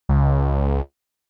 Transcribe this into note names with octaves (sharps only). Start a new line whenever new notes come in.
C#2